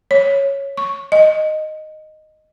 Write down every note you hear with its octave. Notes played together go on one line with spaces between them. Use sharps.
C#5
C#6
D#5